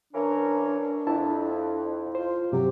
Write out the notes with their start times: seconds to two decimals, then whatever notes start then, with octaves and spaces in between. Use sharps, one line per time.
0.13 E3 C#4 D4 A#4
1.07 F2 E4 A5
2.15 F4 C5
2.52 G2 C3 F#3 G4